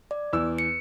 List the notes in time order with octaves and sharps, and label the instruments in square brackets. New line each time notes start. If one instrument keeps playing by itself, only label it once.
[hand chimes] D5
[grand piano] E2 E6
[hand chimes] C#7